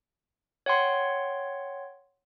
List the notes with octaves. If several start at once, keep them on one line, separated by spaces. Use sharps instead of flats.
C#5 F#5 G5 C6